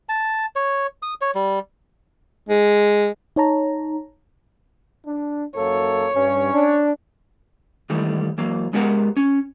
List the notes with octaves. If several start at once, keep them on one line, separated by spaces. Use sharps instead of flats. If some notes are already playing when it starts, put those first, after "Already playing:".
A5
C#5
D#6
C#5
G3
G#3
D#4 C#5 A5 A#5
D4
F#2 A#3 A4 C#5
G2 C#4
D4
D#3 E3 G3 A3
E3 F#3 A#3
G#3 B3 G4 A#4 F#5
C#4